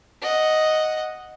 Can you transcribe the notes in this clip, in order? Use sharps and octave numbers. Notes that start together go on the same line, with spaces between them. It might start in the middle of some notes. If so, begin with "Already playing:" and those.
D#5 F#5